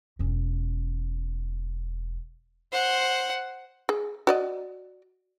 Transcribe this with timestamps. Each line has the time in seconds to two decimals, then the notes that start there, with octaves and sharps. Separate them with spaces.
0.19 E1 C#4
2.72 C5 F#5
3.89 G#4
4.27 F#4 D5 D#5